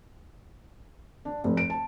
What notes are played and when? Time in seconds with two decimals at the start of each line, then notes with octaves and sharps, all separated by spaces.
1.25 D4
1.44 F1
1.57 D7
1.70 A5